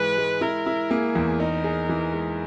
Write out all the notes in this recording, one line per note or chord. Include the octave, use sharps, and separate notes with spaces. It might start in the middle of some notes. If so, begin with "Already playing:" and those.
Already playing: G#2 E3 G#3 B4
G#3
E4 A#4
E4
A#3 G#4
E2
D#4 A#4
G#4
E3
G#3